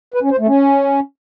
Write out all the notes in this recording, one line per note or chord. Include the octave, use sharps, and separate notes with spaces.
B4
C#4
C5
A3
C#4